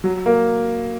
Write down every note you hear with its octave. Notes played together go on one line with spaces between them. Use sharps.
F#3
A#3